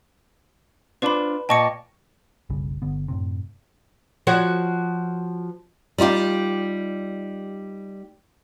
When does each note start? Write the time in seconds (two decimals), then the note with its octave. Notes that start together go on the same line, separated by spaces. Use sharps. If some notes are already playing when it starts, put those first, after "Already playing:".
1.02 D4 F4 B4 C5 B5
1.49 A#2 D#5 G5 A5 C#6 C#7
2.50 F#1 B1 C#3 G3
2.82 G1 D3 B3
3.08 F#2 A2 C3
4.27 F3 F#4 C#5
5.98 G3 D#4 F4 G4